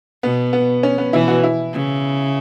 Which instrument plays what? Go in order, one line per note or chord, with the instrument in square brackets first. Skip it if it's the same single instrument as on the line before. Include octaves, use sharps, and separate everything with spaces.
[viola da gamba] B2 [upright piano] B3
[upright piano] B3
C#4
B3
[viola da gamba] B2 E3 [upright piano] E4
[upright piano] F#4
E4
[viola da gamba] C#3